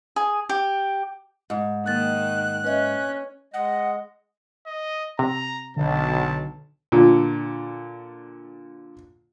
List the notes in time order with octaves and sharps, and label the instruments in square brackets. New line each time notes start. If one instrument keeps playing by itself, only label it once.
[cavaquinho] G#4
G4
[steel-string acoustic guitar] G#2
[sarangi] D#3 [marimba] A#3 A6 [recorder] F#6
[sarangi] C#4 [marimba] B4 D#5 E5
[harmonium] G#3 D#5 [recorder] F#5
[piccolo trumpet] D#5
[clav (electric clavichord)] C3 [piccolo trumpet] A#5
[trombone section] B1 [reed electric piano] D3 [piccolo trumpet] A5
[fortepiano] A#2 D3